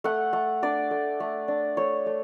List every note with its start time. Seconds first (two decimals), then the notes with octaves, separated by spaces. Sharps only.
0.04 A3 F#5
0.33 A3
0.63 D4 D5
0.91 A3
1.20 A3
1.48 D4
1.77 A3 C#5
2.06 A3